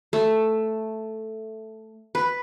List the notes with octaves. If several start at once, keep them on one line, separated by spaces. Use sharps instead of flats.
A3
B4